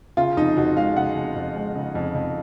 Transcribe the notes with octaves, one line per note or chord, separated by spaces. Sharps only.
C#3 F4
F2 D#4
F2 F#4
G#3 F5
C#3 F#5
F2
F2
G#3
C#3
F2
F2